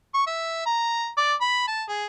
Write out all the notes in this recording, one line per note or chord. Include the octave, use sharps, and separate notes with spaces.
C#6
E5
A#5
D5
B5
A5
G#4